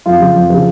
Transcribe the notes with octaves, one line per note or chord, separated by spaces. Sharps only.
F2 F4
C#3 F3
F2
C#3 F3